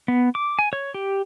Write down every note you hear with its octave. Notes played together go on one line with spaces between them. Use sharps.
B3
D6
G#5
C#5
G4